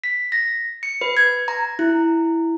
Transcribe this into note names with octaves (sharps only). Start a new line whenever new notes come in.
B6
A#6
C#7
B4
G#6
A#5
E4